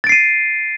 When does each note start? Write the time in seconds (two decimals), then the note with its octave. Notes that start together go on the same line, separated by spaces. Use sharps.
0.04 A6
0.07 D7
0.09 C7
0.12 D#7